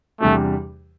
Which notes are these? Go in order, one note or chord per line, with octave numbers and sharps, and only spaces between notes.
E2 C3 G3 A3 D4 G4